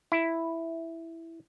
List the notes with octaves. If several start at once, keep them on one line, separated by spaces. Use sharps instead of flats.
E4